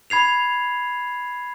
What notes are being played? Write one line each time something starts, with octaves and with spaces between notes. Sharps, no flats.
B5 G#6 C7 F7